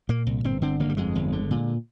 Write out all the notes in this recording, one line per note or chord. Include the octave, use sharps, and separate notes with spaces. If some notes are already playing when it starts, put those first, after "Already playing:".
A#2 A#3
C2
G1 C4
D3 C4
G1 A#3
G3
F2 G#3
G1
D3
A#2